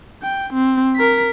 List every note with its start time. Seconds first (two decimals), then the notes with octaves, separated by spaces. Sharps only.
0.23 G5
0.53 C4
0.96 A#4 B6